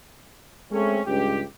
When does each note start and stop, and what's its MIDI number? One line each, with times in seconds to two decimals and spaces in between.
0.72 0.99 56
0.72 0.99 57
0.72 0.99 60
0.72 0.99 61
1.06 1.40 37
1.06 1.40 43
1.06 1.40 67